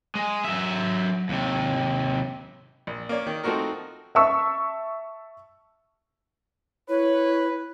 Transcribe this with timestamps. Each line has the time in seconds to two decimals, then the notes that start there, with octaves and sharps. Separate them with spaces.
0.15 G#3
0.45 F#3 E5
1.29 D#2 C3
2.87 A#1
3.09 A#3 C#4 D5
3.27 D#3
3.44 F3 A3 C4 D#4 F#4 A#4
4.15 E5 A5 C#6 E6
6.89 E4 B4 C#5